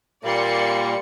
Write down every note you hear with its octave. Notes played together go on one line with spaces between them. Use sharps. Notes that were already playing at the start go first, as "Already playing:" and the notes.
A#2 G3 A#3 D5 C6 C#7